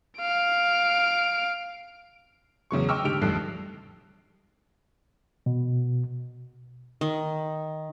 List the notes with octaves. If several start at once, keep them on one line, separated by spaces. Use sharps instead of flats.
F5 D7
E2 C#3 F#3 C#6
D#5 G5 C#6 D6 E6 F6
G#2 D3 G4 D7 F7
A1 F2 G3 A4 F#6 C7
B2
D#3